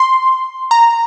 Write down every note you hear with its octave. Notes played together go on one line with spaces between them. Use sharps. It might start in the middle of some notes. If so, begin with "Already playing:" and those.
Already playing: C6
A#5